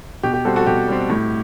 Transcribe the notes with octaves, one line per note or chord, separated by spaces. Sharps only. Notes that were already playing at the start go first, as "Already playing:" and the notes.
B2 G4
G4
G3 C4 F#4 A4
F#4 A4
B2 G4
G3 C4
A2